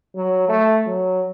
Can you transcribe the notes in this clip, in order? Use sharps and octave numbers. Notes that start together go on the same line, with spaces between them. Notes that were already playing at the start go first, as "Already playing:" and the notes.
F#3
A3
F#3